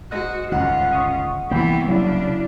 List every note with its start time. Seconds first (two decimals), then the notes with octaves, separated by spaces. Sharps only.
0.11 G#2 F#4 D#5 F#6
0.52 G1 C#2 D#3 C#4 F4 F#5 F#6
0.92 C#6 D#6
1.51 C2 E3 A#3 B3 G5
1.88 C#3 F#3 D4 E4